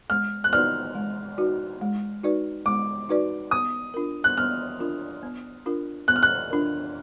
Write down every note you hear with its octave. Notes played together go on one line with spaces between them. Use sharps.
G#3 F6
F#6
D#4 F#4 B4 D5 F6
G#3
D#4 F#4 B4 D5
G#3
D#4 F#4 B4 D5
G#3 D6
D#4 F#4 B4 D5
B3 D#6
D4 F4 A#4
F#6
B3 F6
D4 F4 A#4
B3
D4 F4 A#4
B3 F#6
F6
F#6
D4 F4 A#4